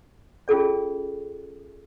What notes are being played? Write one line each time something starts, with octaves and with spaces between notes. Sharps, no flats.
C#4 F4 G#4 A4 D5